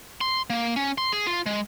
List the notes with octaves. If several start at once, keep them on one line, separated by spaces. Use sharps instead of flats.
C6
A#3
C#4
C6
G#4
F4
G#3